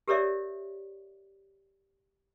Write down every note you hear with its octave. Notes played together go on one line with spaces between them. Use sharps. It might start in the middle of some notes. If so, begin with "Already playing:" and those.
G4 A4 A#4 C#5 D5 E5